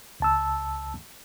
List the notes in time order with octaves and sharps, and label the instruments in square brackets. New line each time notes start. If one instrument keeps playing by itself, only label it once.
[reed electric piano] C#2 A5 E6